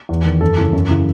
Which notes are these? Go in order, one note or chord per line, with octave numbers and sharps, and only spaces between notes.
E2
D#3
F#2 A4
C#3 E3
F#2
C#3 E3